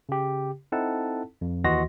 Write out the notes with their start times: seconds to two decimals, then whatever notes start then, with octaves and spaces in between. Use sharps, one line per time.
0.09 C#3 G4
0.72 C4 D#4 E4 A4 F#5 A5
1.41 F2
1.64 D#2 E3 F#4 D#5 C6 A#6